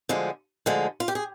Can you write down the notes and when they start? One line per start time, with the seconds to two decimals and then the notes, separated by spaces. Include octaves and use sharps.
0.09 D2 D3 F3 G#3
0.66 D2 D3 F3 G#3
1.00 F4
1.08 G4
1.15 G#4